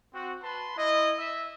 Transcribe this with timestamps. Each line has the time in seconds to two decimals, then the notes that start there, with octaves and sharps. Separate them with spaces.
0.14 C4 F#4
0.43 B4 A5 B5 C6
0.77 E4 D#5
1.18 E5